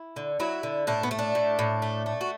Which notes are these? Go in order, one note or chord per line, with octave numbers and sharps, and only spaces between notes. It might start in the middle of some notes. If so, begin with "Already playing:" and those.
Already playing: E4
D3
F#3 E4
D3
A2 D4
B3
A3
D4
A2
A2
A3
A3
F#4